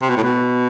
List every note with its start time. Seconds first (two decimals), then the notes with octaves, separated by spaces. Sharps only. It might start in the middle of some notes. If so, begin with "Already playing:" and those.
0.02 C3
0.09 B2
0.17 A2
0.23 B2